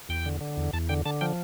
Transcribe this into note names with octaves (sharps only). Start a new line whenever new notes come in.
E2 G5
D3
D3
E2
E2 A5
D3 G5
D3 A5
F3 G5